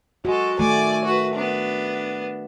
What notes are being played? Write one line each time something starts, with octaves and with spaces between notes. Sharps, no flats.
G#3 F#4 A4
D#3 A3 D5 G#5
F#4 B4
B3 D4